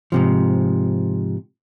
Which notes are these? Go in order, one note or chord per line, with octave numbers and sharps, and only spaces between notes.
G#2 C3 F3